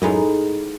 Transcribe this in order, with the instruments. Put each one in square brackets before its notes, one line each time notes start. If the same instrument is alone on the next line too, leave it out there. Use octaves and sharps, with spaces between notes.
[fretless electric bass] F#2 [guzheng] A2 G#3 B3 D#4 G#4